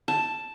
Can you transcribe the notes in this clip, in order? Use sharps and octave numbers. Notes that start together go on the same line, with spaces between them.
A5